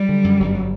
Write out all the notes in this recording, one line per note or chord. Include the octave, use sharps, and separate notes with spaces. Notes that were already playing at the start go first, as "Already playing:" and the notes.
Already playing: F#3 G3
D3
F#2
G1
F#3